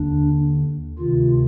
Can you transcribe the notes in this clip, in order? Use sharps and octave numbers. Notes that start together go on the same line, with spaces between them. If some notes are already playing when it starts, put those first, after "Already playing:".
Already playing: D#2 D3 D4
D2 C3 D#3 F4